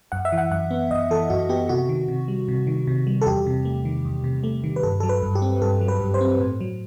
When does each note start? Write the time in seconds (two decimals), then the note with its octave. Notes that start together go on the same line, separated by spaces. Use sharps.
0.12 F#2 F#5
0.25 E5
0.32 E3
0.38 F#5
0.52 F#2 F#5
0.71 B3
0.91 F#2 D#5
1.11 E3 A4
1.30 F#2 F#4
1.49 B3 G4
1.69 C3 F#4
1.89 D#3
2.08 C3
2.28 G3
2.48 C3
2.67 D#3
2.87 C3
3.07 G3
3.22 A4
3.26 E2 G4
3.47 C3
3.65 A3
3.85 D#3
4.05 E2
4.24 C3
4.44 A3
4.64 D#3
4.76 B4
4.83 G2 A4
5.00 F#3 A4
5.09 B4
5.23 G2
5.35 G4
5.42 C4
5.62 G2 A4
5.81 F#3
5.88 B4
6.00 G2
6.14 C5
6.21 C4
6.40 A2
6.61 F#3